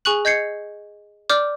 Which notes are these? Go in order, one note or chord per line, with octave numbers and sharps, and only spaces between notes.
G#4 G#5 C#6 F#6 F#7
D#5 G6 G#6 C7 C#7
D5 D6 F6 G6